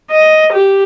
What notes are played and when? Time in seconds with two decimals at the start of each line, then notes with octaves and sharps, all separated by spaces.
0.11 D#5
0.53 G4